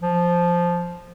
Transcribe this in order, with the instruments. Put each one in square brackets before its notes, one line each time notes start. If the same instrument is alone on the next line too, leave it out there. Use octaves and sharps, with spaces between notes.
[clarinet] F3